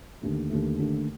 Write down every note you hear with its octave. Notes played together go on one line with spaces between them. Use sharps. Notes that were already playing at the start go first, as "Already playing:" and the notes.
D#2 D3 A3
D#2 D3 A3
D#2 D3 A3